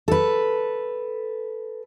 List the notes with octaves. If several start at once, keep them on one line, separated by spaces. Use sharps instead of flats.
A4 B4